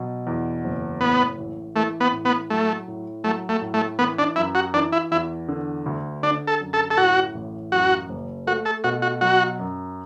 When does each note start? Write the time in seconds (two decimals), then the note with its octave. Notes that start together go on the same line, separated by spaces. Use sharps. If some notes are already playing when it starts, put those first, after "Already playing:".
Already playing: B2 F#3
0.27 E2
0.64 F#1
1.01 A2 B3
1.38 A1
1.76 E3 A3
2.01 B3
2.13 A2
2.25 B3
2.50 F#3 A3
2.88 A2
3.24 F#3 A3
3.49 A3
3.62 A2
3.74 A3
3.99 E3 B3
4.19 D4
4.36 F#2 E4
4.55 F#4
4.74 E3 D4
4.92 E4
5.11 E2 E4
5.48 D3
5.86 D2
6.23 D3 D4
6.47 A4
6.61 F#2
6.73 A4
6.91 A4
6.97 A2 F#4
7.35 A1
7.72 F#2 F#4
8.09 F#1
8.47 A3 F#4
8.65 A4
8.84 B2 F#4
9.02 F#4
9.21 F#3 F#4
9.59 F#2